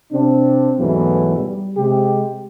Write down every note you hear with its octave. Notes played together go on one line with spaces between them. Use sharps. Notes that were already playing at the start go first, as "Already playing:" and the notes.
C3 C4 D4
E2 G#2 B2 E3 F#3 A3
G3
C3 G#3 G4